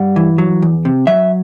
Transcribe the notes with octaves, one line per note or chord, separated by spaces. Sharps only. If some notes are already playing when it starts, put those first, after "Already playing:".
Already playing: G2 G3 F#5
E3
F#3
E2
C3
F#3 E5